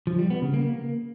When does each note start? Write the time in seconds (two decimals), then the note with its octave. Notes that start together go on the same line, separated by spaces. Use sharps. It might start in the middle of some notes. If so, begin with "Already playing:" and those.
0.07 F3
0.19 G3
0.30 B3
0.42 C#3
0.54 A#3